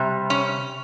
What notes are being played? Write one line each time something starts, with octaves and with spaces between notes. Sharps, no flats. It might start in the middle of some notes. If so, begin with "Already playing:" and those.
Already playing: C3 G3
C#4